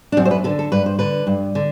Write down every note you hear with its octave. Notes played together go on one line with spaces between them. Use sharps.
D4
F#2 C4
C5
B4
D3 A4
A4
G2 B4
C5
D3 B4
G2
D3